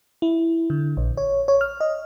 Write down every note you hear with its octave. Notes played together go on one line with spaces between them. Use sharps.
E4
D3
A#1
C#5
C#5
F6
D#5